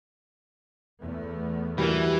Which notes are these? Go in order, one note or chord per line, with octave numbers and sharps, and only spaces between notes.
E2 A3 B3
E3 G3 F#4 A#4